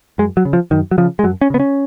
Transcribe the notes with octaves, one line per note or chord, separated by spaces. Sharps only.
F#2 G#3
F#3
C#3
F3
F#2 D#3
F#3
C#3 F3
G#3
F#2 F#3
C#4
C#3 B3
C#4